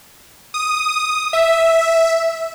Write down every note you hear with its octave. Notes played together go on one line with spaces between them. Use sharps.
D#6
E5